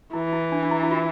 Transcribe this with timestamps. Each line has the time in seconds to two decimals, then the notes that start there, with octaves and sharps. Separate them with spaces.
0.13 E3 E4
0.33 E4
0.52 D4
0.63 D4
0.71 E4
0.83 E4
0.91 F4